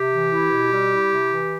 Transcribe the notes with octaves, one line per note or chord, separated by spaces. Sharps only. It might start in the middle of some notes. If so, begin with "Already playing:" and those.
Already playing: C3 G4
E3
E4
B2
G3
E4
C3
E3